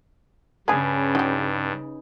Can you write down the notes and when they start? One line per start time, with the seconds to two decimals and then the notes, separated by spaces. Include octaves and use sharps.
0.68 G2 C#3 D4 G#4 B4 G#5 G#6
1.15 F#3 D#4 G4